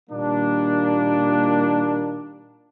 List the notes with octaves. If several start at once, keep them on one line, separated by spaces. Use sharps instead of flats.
A#2 D#3 G3 A#3 D4